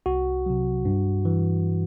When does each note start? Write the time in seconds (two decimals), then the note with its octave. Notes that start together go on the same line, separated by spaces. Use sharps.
0.06 C2 F#4
0.46 C3 F#3
0.85 G2
1.25 E3